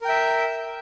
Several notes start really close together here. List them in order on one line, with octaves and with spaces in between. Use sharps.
A#4 G5 E5